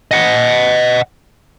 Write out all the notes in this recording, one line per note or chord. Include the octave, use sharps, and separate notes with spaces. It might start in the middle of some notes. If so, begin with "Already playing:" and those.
D#5 F#5